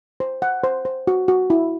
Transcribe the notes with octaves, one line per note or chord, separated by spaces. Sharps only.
C5
F#5
C5
C5
F#4
F#4
E4